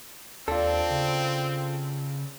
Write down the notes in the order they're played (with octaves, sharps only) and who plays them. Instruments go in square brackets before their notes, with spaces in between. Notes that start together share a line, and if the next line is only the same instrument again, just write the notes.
[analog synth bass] D#2 [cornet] C4 [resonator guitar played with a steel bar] D4 [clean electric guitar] F4 A4
[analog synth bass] C#3